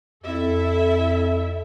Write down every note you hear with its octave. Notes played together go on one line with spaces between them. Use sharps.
F2 E4 A4 E5